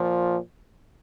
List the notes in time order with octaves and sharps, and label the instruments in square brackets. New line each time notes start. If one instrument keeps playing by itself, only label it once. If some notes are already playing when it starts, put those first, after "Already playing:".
Already playing: [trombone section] A#2 F3